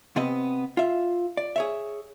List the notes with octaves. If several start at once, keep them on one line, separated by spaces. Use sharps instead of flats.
C3 B3 C4 D#5
F4 E5
D5
G#4 C#5 E5